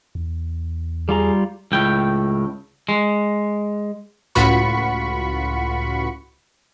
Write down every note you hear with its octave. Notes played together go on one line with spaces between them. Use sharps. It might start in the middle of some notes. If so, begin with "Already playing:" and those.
E2
G3 F4 G#4 A#5
C#2 A2 G5
G#3
C#2 A2 F4 F#4 B5 C#6